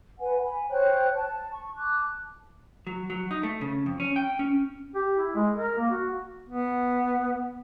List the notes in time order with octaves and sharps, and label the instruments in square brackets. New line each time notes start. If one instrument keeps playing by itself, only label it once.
[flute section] B4 F#5 G#5
G#5 B5
C5 C#5 G5 F#6
A5
C#6
A5 D6 F#6
[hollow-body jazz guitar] F#3
F#3
D#4
A3
C#3
F2
C#4
G5
C#4
[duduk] G4
E4
G#3
A#4
A#3
F#4
B3